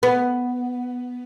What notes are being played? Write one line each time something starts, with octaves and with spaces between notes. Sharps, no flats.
B3